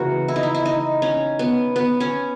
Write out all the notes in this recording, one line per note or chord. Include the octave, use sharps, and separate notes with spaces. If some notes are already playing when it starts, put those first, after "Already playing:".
Already playing: C#3 E3 A#3 F#4 A#4
E4
D#4
E4
E4
D#4
C#4
B3
B3
C#4